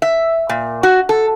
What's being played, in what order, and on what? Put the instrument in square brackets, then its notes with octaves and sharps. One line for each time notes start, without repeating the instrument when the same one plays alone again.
[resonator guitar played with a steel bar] E5
A#2
F#4
A4